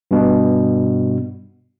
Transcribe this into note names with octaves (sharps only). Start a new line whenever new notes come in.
G2 B2